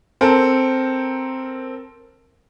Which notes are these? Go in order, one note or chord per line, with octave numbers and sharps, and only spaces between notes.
C4 A4 A#4